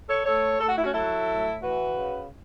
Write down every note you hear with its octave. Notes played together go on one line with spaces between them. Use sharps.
A4 C#5
A3 A4 C#5
A3 A4
F#4
E4
C#4 F#4
F#3 E4 A4
A2
E3 F#4 B4
C#3